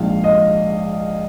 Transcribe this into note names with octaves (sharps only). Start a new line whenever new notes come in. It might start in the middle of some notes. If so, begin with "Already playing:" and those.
Already playing: A#1 G#2 F3 F5
D#5